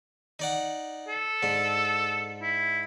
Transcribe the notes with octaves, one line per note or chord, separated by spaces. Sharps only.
D#4 D5 F#5
A4
G#2 D4
E4